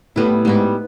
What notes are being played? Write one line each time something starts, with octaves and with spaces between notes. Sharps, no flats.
A2 G3 B3 E4
G#2 G3 B3 E4